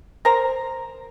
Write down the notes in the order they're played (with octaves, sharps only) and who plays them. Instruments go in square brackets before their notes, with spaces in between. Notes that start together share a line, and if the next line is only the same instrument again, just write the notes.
[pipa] A#4 C5 A#5